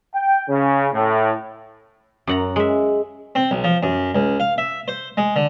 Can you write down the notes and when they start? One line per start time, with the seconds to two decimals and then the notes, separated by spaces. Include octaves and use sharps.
0.14 G5
0.49 C#3
0.94 A2
2.27 F#2 F#5 A#5
2.56 G#3 E5
3.35 C4
3.51 B1
3.64 F3
3.83 F#2
4.15 C#2
4.40 F5
4.58 E5
4.88 C5
5.17 G#3
5.36 D3